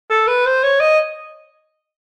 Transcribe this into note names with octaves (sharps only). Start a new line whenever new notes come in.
A4
B4
C5
C#5
D#5